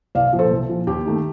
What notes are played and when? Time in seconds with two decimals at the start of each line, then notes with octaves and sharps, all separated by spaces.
0.15 C2 D5 F5
0.33 A#2 F3
0.39 A4 C5
0.51 C2
0.69 A#2 F3
0.87 D#2 G4
1.05 D#3 A3 D#4